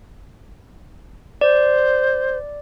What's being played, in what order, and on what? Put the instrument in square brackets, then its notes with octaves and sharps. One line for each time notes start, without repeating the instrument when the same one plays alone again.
[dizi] C5 [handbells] D5